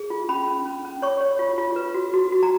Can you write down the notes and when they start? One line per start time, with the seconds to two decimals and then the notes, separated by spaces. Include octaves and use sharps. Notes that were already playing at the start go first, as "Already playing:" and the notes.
Already playing: G#4
0.10 F4
0.29 C#4 B5
0.48 C#4
0.66 C#4
0.85 C#4
1.02 C#5 C#6
1.21 C#5
1.39 F4
1.58 F4
1.76 B4
1.94 F#4
2.14 F#4
2.32 F#4
2.43 A#5